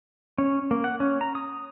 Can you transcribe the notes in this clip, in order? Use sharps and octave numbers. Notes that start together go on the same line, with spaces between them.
C#4
A#3
F#5
C#4
A#5
D#6